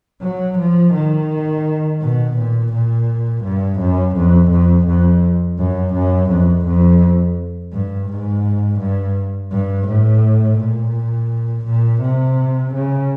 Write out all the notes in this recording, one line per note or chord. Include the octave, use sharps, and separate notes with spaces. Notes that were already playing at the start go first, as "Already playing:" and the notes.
F#3
F3
D#3
B2
A#2
A#2
G2
F#2
F2
F2
F2
F#2
F#2
F2
F2
G2
G#2
G2
G2
A2
A#2
A#2
C3
C#3